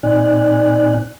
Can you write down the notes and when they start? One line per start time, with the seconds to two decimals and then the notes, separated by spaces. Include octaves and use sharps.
0.03 A#2 C4 D#4 D5 G#5 F#6